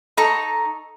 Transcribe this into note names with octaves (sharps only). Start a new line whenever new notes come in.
D#4 A4 A#5 C#6